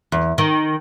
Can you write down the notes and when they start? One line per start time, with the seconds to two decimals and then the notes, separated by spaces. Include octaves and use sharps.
0.12 E2
0.38 D#3